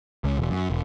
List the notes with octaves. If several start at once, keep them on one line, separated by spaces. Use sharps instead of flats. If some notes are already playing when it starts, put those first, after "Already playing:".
C#2
E1
F#2
E1